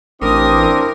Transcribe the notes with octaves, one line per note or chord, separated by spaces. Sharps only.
A1 C4 D4 E4 A#4 D5 D6 D#6